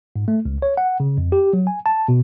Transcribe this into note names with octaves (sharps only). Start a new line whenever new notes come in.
G#2
A3
C#2
C#5
F#5
C#3
F2
G4
F#3
G#5
A5
B2